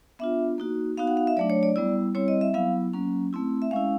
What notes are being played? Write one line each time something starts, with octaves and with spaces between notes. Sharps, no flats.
B3 D4 F4 E5
A#3 D#4 F#4
B3 D#4 F#4 F5
F#5
F5
E5
F#3 A3 D4 D5
C#5
D5
G3 B3 E4 D5
G3 C4 E4 C#5
D#5
E5
F#3 B3 E4 F5
F#3 A#3 C#4
A3 C4 E4
E5
G#3 C#4 E4 F5